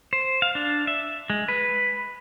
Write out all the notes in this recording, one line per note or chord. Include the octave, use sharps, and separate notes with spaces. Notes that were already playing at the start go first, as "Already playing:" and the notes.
C5
F5
D4
E5
G#3
B4